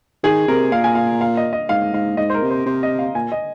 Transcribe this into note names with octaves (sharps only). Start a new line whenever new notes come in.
D#3 G#4
C3 A#4
A#2 F5
G#5
F5
F5
D#5
D#5
G#2 F5
G#2 F5
G#2 D#5
C5
A#4
C3
C5
C3 C5
D#5
F5
A#2 G#5
D#5